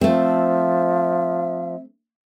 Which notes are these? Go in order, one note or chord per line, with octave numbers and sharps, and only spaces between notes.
F3 A3 C4 E5